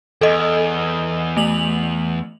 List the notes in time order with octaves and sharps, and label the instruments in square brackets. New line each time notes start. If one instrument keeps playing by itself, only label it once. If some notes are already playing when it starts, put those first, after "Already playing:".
[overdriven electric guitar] E2 [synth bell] A4 D#5
[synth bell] A3 F7 F#7